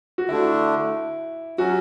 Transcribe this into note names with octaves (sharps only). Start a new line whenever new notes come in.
F#4
D3 A3 D4 E4
F#3 C#4 F#4